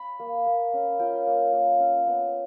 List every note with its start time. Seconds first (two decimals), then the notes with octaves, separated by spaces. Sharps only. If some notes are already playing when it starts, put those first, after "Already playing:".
Already playing: B5
0.19 A#3
0.46 A#3
0.73 C#4
0.99 F4 G5
1.27 A#3
1.53 A#3
1.79 C#4
2.07 B3